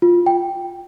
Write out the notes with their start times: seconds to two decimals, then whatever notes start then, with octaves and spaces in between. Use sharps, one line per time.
0.02 F4
0.26 G5